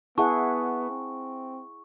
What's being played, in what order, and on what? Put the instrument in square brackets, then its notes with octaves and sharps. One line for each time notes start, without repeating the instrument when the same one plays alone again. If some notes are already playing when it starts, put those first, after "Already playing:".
[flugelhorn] B3 [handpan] E4 G#4 F#5 [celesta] E5 A5 [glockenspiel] C#6
[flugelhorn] C4